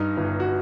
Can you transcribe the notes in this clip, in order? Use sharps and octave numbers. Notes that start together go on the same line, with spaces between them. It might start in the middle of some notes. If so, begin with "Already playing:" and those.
Already playing: G2 D#4
G1
F#4